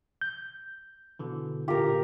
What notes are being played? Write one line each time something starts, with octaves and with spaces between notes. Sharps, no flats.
G6
B2 D3 E3
A#2 D3 D4 F4 G4 A#4